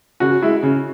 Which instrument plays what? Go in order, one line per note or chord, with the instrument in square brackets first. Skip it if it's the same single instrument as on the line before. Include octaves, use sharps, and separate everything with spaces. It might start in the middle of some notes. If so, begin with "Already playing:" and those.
[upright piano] C#3 [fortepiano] F#4
[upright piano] G#3 E4
C#3